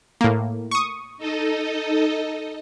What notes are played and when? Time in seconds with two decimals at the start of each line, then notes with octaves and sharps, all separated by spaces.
0.21 A2 A#3
0.71 C#6 D#6
1.18 D#4 A4 D#5